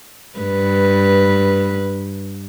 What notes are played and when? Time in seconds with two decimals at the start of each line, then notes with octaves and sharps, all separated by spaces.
0.39 G2 B4